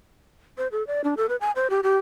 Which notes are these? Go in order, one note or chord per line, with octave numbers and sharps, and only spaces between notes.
C5
A4
D5
D4
A4
B4
G#5
C5
G4
G4